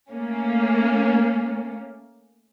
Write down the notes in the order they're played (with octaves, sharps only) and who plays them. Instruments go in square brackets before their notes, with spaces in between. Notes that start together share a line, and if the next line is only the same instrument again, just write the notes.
[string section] A3 A#3 C#4